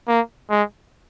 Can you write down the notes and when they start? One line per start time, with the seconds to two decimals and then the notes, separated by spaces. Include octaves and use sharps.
0.08 A#3
0.50 G#3